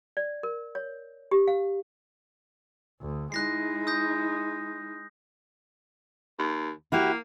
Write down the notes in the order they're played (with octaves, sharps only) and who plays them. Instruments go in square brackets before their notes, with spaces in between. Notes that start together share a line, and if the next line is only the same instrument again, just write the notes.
[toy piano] D5
A#4
C#5
G4
F5
[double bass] D2
[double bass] G#3 [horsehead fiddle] D#4 E4 [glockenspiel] F#6 A#6 C7
[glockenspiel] D#6 G6 A#6
[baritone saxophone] D#2
[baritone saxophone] A#3 [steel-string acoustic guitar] E4 F#4 G4